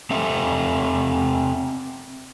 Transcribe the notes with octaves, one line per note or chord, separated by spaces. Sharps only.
C4 G4 A4 E5